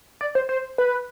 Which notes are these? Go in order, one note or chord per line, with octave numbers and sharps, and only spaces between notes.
D5
C5
C5
B4